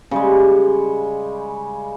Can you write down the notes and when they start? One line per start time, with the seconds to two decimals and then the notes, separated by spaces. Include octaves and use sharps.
0.11 C#3 G3 G#3